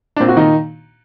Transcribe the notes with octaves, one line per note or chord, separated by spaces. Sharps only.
D4
A#2 C4
F#4
D#3 D#4